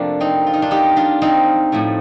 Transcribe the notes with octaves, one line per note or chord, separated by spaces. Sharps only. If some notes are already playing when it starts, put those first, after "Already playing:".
Already playing: F2 C3 F3 A3 A#3 D4
C4 D#4
F4
D#4
D4 F4
D#4 G4
D4 F4
C4 D#4
A2 F3 A3